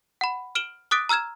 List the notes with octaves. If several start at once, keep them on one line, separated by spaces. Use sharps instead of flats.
F#5 B5
F6 D7 E7 F#7 G7
D6 D#6 F#6 A6 B6 D7
A#5 E6 F6 G#6 E7